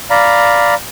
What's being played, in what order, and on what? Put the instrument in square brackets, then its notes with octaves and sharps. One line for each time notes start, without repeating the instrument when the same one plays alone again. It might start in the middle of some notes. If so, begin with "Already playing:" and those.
[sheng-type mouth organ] D5 F5 A#5 B5